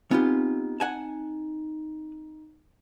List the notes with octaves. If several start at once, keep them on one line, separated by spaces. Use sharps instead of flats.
B3 C4 D#4 F4 G4
F#5 G#5 A5